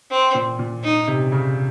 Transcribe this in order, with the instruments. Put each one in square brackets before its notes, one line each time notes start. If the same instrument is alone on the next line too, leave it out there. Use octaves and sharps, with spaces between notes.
[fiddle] C4
[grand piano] A#2
A#2
[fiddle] D#4
[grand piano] C3
C#3